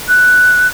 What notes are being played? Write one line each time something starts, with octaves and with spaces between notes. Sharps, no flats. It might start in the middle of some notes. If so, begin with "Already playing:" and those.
F#6